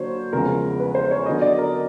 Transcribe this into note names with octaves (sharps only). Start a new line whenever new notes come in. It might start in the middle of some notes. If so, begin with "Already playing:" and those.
Already playing: D3 F#3 A#3 D4 C5 C#5
E2 C#3 F3 G#3 A#4
B4
C5
C#5
D3 F#3 B3 D#5
D5
A#4